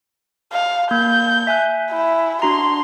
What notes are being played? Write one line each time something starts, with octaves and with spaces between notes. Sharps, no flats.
F5
A#3 G6
E5 G#5 F#6
E4
D4 F#4 A#5 C6